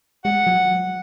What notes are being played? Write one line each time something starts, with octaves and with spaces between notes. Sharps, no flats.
G#3 F#5
F#3